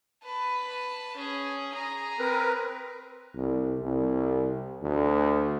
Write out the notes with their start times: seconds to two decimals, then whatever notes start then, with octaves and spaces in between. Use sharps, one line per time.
0.24 B4 A5
1.16 C#4 G#4
1.72 G#4 A#5
2.19 C4 A#4 B4
3.36 C2
3.83 C2
4.83 D2